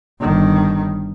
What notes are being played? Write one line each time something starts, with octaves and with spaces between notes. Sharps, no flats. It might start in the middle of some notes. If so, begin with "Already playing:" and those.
G1 D#3